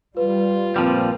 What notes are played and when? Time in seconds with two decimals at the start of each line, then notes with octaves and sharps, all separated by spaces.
0.17 G3 F4 B4
0.76 A#2 F3 G3 C4